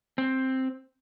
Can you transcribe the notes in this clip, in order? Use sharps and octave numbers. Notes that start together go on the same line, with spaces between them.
C4